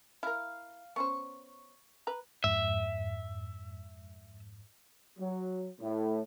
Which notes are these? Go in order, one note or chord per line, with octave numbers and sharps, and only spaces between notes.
E4 A#4 F5
B3 C#4 C5 C#6
B4 A#5
F2 G#2 E5
F#3
A2